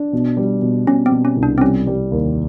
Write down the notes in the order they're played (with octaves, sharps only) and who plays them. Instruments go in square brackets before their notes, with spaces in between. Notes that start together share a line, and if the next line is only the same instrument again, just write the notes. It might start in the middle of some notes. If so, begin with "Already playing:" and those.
Already playing: [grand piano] D4
B2
G3
B2
[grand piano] B2 [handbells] C#4
[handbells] C4
[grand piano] B2
[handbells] C#4
[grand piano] C2
[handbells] D4
C4
[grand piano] G3 [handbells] C#4
[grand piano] G3
D#2